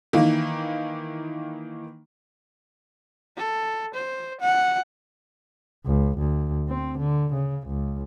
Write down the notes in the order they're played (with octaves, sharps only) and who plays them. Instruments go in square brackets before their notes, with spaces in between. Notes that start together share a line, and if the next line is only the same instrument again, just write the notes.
[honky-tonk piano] D#3 E3 A#3
[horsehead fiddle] A4
C5
F#5
[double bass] C#2
D2
C4
D3
C#3
C#2